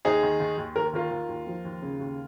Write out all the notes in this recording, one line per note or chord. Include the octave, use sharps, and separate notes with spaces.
D#2 D#4 G#4
D#3
D#3
D#2
D#2 A#4
D#3 F4 A#4
D#3
D#2
F3
D#2
C#3
D#2